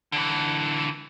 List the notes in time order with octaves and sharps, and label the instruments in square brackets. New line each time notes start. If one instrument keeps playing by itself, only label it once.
[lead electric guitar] D3 E3